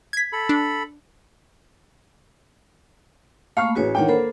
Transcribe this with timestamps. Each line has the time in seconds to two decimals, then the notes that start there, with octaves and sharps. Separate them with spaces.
0.13 G#6 B6
0.32 A4 B5
0.49 D4
3.57 A3 A#3 F5 B5 C#6 F6
3.75 A1 F#4 G#4 B4 C#5
3.95 D#3 E3 D4 C#5 F#5 G5
4.08 A#3 A4 A#4 C5 B5